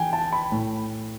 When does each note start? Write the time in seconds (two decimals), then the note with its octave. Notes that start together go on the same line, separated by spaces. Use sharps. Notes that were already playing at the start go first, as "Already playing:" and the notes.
Already playing: E3 G5 G#5
0.13 A5
0.32 B5
0.52 A2